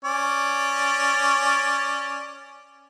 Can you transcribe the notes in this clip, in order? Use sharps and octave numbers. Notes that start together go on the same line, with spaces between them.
C#4 D5